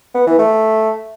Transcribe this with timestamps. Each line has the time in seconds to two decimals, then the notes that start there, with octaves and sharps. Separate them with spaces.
0.15 B3
0.27 E3
0.38 A3